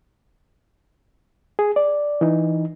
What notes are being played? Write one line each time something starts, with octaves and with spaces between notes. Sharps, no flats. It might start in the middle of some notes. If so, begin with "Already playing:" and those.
G#4
D5
E3 D#4